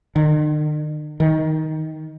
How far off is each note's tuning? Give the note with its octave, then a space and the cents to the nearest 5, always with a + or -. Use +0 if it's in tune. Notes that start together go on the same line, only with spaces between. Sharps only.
D#3 -45
D#3 +10